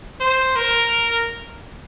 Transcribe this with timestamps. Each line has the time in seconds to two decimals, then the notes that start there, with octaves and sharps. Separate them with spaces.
0.21 C5
0.56 A#4